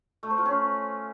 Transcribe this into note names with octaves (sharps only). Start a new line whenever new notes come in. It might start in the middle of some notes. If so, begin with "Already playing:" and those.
A3
C5
F4
C#4